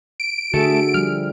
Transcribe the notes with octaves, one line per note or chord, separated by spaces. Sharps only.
D7
D3 A3 F#4 G#4 E5 A5 C#7
F3 G3 F6